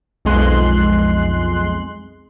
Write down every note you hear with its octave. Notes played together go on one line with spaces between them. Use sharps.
B1 F2 G#3 C6 F#6